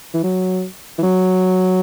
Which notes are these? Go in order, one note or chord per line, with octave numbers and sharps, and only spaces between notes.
E3
F#3
E3
F#3